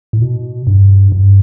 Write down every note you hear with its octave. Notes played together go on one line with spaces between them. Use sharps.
A2
B2
G2
G2